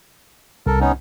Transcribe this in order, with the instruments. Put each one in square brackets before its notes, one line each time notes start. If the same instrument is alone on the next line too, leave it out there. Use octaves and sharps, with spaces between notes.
[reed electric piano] C2 [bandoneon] A4 A#4
[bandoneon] B3 C#4 D#4